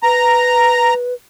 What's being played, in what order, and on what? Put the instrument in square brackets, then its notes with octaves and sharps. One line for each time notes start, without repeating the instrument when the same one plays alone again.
[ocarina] B4 [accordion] A#5